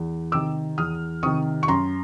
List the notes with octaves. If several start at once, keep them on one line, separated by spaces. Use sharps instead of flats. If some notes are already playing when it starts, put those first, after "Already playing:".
Already playing: E2
C3 D#3 D6 E6
E2 D#6 F6
C3 D#3 C#6 D#6
C#6
F#2 A#5 C6